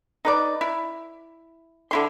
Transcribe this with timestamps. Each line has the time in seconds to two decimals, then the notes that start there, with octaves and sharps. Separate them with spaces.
0.25 D#4 B4 D5
0.61 E4
1.91 D3 E4 C6